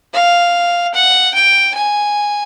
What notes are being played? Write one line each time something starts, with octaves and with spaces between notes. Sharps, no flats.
F5
F#5
G5
G#5